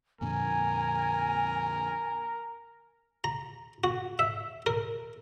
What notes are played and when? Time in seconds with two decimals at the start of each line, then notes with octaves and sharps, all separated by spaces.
0.21 F2 A#2 D3 A#4 G#5
3.24 A#5
3.84 F#4
4.19 E5
4.66 A#4